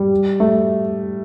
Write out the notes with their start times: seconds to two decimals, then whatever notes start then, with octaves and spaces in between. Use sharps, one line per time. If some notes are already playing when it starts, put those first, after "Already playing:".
Already playing: G3
0.40 A3